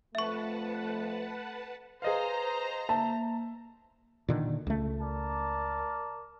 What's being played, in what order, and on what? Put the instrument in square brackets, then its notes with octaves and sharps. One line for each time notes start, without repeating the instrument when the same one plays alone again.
[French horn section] F2 F3 A3 [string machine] B4 F#5 A5 [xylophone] E5 C#6
[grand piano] G#4 D#5 F5 [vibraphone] B4 [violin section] C5 A#5
[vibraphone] A#3 [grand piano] E5 [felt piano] A5
[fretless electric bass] A#2 D3 D#3
C#2 A3
[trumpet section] A#4 D5 A5